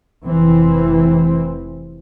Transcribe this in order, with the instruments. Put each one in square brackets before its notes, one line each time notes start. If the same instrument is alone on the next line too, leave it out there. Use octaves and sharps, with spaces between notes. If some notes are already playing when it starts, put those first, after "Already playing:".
[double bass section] F1 E3 C4